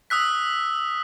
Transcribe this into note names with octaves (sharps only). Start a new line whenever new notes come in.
D#6 E6 F#6 B6